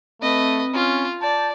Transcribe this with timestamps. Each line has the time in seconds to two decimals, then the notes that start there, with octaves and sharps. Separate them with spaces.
0.22 A3 C4 B4 D#5
0.74 C#4 F4
1.21 D5 A5 G6